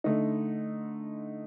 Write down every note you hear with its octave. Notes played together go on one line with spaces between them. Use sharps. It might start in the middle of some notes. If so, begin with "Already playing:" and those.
D3 A3 D#4